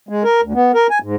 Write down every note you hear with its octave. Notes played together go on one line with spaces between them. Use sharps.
G#3
A#4
D2
B3
A#4
G#5
G#2